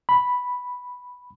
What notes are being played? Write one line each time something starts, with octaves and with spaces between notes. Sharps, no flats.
B5